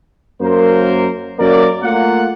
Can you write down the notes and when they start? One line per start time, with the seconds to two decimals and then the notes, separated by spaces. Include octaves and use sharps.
0.42 F#2 A#3 A#4 C5
1.39 F#2 A#3 A#4 D5
1.83 A3 A#3 F4 F#5